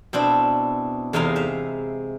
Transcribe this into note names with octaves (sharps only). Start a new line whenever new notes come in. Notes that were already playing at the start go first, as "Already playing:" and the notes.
B2 C4 D4 E4 A5
E2 C3 G#3 D#4 F5
E5 F5